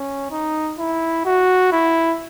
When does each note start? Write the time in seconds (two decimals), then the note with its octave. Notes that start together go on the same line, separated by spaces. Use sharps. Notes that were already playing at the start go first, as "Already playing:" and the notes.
Already playing: C#4
0.31 D#4
0.79 E4
1.25 F#4
1.72 E4